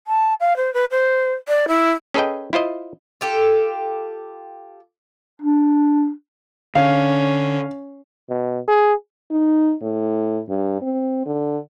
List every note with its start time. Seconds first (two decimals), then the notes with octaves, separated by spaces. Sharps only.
0.07 A5
0.40 F5
0.56 C5
0.73 B4
0.91 C5
1.48 D5
1.68 E4
2.14 C#4 G#4 A4 B4 D#5 G5
2.53 E4 F4 C5 D#5
3.21 F4 G4 A4
5.42 D4
6.75 D3 C#4 F5
8.30 B2
8.68 G#4
9.31 D#4
9.81 A2
10.49 G2
10.81 C4
11.26 D3